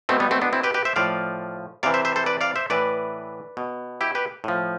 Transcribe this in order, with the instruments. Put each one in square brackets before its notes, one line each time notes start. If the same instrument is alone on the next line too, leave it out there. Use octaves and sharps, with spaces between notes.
[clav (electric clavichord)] B2 A3 C4
G3 B3
A3 C4
B3 D4
C4 E4
G4 B4
G4 B4
C5 E5
A2 F3 D5 F5
C3 E3 D5 F5
C5 E5
C5 E5
A4 C5
B4 D5
D5 F5
C5 E5
A2 E3 B4 D5
B2
E4 G4
G4 B4
A2 F3